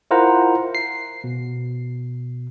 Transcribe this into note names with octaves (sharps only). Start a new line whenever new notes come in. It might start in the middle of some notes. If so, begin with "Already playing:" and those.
E4 F4 A#4 C5 F#5 A#5
C7
B2